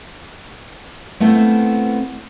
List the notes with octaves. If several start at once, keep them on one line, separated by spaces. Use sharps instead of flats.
A3 B3 C4 E4 F4